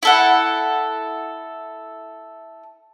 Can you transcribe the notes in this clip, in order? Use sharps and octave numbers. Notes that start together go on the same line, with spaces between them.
E4 A4 F#5